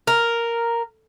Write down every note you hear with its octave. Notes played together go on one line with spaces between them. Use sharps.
A#4